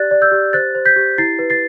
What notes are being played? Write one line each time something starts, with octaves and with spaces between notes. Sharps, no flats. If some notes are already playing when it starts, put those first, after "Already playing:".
Already playing: G4 D5 F#6 A6
D5
E6 G6
G4
C5 F#6 A6
C5
G6 B6
G4
E4 A6 C7
B4
A6 C7